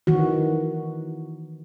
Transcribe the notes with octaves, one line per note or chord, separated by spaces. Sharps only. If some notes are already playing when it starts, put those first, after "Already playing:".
D#3 E3 F#4